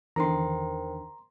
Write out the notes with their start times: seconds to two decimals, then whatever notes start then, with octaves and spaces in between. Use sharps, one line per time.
0.16 E2 D3 D#3 A#4 C5 G5 A#5 C6